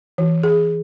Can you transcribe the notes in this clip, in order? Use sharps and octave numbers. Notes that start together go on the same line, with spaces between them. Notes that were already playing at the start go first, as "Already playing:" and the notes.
E3
G#4